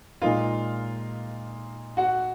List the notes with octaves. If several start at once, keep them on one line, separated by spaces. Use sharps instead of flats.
A#2 G#3 D#4 F4 A#4 F5
F#4 F#5